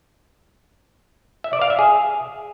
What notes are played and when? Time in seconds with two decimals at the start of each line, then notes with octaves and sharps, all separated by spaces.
1.44 E5
1.53 D5
1.62 F5
1.70 E5
1.79 G#4